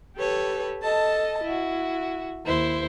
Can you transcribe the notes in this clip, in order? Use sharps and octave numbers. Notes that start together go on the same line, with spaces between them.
G4 A4 B4 C#5
A4 D#5 A5
E4 F#4
D#2 E4 C5